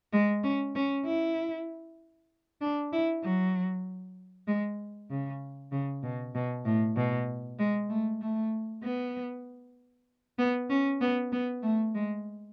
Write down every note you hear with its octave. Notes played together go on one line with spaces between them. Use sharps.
G#3
C#4
C#4
E4
D4
E4
F#3
G#3
C#3
C#3
B2
B2
A2
B2
G#3
A3
A3
B3
B3
C#4
B3
B3
A3
G#3